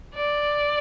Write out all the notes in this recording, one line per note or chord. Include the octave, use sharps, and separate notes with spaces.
D5